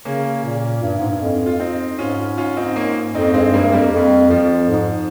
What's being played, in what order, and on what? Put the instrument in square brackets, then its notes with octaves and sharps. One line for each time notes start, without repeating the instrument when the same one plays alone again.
[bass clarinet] C#3 [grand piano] A#3 C#4
[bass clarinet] A#2
G2
G#2
G2
F2
[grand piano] F4
C4 D#4
[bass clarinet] G#2 [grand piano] C#4 F4
[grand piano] C#4 F4
C4 D#4
A#3 C#4
[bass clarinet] F2 [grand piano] C4 D#4
[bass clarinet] G2 [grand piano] G#3 C4
[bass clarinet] G2 [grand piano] G3 A#3
[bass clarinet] F2 [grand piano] G3 A#3
[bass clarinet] F2
[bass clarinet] F2 [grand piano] F3
[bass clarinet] G#2